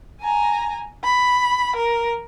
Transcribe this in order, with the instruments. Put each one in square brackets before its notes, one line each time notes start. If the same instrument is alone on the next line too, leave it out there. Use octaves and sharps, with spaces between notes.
[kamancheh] G#5 A#5
B5
A#4